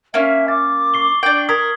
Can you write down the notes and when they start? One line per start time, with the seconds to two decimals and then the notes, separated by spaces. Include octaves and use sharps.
0.14 A#3 C#4 E5
0.48 D6 A6
0.94 C#6 C7 G7
1.23 D4 G5 F#7
1.49 A#4 D#6 G#6 B6